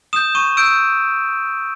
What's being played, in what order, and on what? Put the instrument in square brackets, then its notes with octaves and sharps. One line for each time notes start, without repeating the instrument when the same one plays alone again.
[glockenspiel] D#6 G6 E7
C#6 D#7
E6 G6 D7